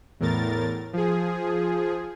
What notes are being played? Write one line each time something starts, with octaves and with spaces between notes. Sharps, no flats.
E2 A2 A#4 A6
F3 G#4